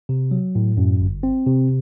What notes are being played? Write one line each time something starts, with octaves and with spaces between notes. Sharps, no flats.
C3
F#3
A2
F#2
G1
C4
C3